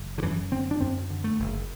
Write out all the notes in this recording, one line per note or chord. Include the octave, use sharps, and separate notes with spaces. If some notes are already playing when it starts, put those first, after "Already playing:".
Already playing: F#1
D3
F#2 E3
D3 C4
D4
F#2 C4
D3
A3
F#1